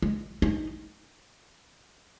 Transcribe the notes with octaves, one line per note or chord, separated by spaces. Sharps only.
G#3
D#4